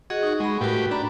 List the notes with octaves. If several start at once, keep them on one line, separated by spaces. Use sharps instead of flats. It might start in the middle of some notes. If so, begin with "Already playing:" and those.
F#4 G#4 D#5
D#4 C#6
G#3 F#5 B5
A2 F#4 G4 A#4 B4
D4 A#5 B5